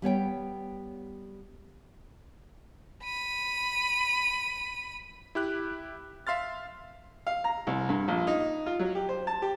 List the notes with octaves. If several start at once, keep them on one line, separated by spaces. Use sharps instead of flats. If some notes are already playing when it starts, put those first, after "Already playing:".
G3 B3 C#5 G5
B5 D#7
E4 G4 F#6
E5 F5 C6 F6 A6
F5
A#5
C2
G2
A#1
D#4
F4
F#3
G4
C5
A5
G4